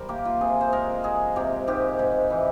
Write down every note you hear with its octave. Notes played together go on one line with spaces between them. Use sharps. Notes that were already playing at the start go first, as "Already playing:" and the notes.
Already playing: G3 A#4 C5
A#3 G4
F4
C3 G#4
C5
G#3 A#4
G#3 G#4
C3 G4
G#2 G4
G#2
E3